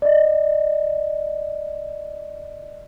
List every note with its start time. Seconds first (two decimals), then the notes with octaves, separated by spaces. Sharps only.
0.02 D5 D#5